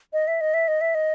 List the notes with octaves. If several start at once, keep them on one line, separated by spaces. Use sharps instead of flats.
D#5
E5
D#5
E5
D#5
E5
D#5